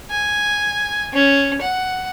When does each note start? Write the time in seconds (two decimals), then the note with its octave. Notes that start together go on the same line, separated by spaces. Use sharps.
0.11 G#5
1.13 C#4
1.61 F#5